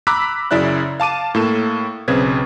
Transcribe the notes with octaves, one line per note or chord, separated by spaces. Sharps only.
A#5 B5 D6 E6 F#6 B6
F#2 C#3 E4 D5 E5 F#6
F5 A5 D6 D#7
A2 A#3 A4 E7
B1 C#3 C4 B4 G#6